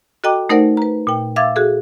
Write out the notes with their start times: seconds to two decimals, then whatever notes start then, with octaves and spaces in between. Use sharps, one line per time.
0.24 F#4 A4 D#5 G5 A#5 D6
0.49 A3 D#4 A#4 C5 D5 F#5
0.77 B4 A#5
1.07 A#2 G5
1.36 E5 F5 D6 E6 G#6 A6
1.56 F#4 G#4 A4